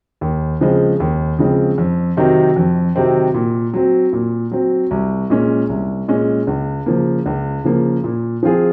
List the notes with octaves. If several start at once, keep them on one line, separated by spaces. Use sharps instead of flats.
D#2
C#3 F3 G#3 C4
D#2
C#3 F3 G#3 C4
F2
C3 D#3 F#3 C4
F2
C3 D#3 F#3 C4
A#2
F#3 C4
A#2
F#3 C4
C2
A#2 G#3 C#4
C2
A#2 G#3 C#4
C#2
C#3 F3 A#3
C#2
C#3 F3 A#3
A#2
F3 C4 F4 G#4